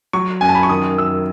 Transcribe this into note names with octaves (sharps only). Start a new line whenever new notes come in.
F#3 C#6
F#2 G#5
A5
B5
C#6
D#3 D#6
F#2 E6